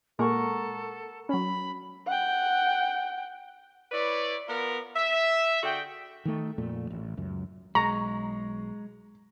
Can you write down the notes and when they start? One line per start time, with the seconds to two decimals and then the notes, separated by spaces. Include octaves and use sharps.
0.19 A#2 G#3 A#3 A4 A#4 F#5 C#6
1.29 F#3 C#4 B5
2.07 F#5 G5
3.92 E4 B4 C#5 D5
4.48 B3 F4 A#4
4.96 E5
5.63 D3 F#4 G#4 G5
6.25 D#3 A3
6.58 F2 A#2 A3
6.90 A1
7.17 C#2 F#2
7.75 B1 G#3 A#5 C#6